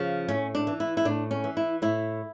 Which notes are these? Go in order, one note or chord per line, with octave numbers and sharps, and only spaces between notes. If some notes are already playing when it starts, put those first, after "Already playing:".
Already playing: C#3 F3
A2 C#4
D4
E3
E4
E4
A2 D4
C#4
E3
E4
A2 E4